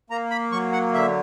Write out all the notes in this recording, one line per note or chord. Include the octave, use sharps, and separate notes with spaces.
A#3 A#5
B5
F#3 C#6
F#5
D3 E5